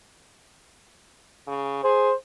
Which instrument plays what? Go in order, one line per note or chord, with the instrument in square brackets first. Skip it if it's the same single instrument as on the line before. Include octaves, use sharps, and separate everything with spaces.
[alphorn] C#3
[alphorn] G#4 [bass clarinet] C5